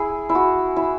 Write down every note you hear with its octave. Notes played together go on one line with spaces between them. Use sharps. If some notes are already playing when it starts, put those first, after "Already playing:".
Already playing: E4 G#4
E4
F#4
E4